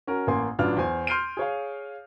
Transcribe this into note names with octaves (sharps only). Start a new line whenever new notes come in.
C#4 F#4 A#4
A1 A#3 G#5 C6
A1 F#3 D4 F4 B4 F6
E2 C5 G#5
C6 F6 G6 C7 D7 D#7
G#4 C#5 F5